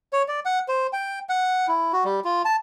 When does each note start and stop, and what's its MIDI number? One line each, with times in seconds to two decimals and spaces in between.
0.13 0.23 73
0.28 0.40 74
0.45 0.59 78
0.68 0.87 72
0.93 1.19 79
1.29 1.67 78
1.68 1.92 64
1.93 2.04 66
2.04 2.20 55
2.24 2.42 65
2.45 2.56 81